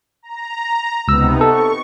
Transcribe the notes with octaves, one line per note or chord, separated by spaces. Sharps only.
A#5
C#2 C3 B3 D#4 E6
A4 C#6